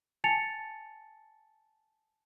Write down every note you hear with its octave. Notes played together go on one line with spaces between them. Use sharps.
G#5 A5 A6 C#7 F7